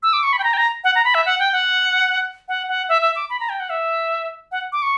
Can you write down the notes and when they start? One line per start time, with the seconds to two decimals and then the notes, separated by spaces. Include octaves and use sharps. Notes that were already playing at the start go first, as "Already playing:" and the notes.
0.03 E6
0.13 D6
0.23 C#6
0.33 B5
0.39 G5
0.44 A#5
0.53 G5
0.57 A#5
0.84 F#5
0.95 A#5
1.05 B5
1.15 E5
1.26 F#5
1.40 G5
1.53 F#5
2.48 F#5
2.68 F#5
2.89 E5
3.02 E5
3.16 D6
3.30 B5
3.40 A#5
3.49 G5
3.60 F#5
3.70 E5
4.52 F#5
4.72 D6
4.82 C#6